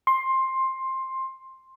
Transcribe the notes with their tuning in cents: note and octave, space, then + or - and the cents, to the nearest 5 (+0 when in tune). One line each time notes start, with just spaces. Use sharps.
C6 +15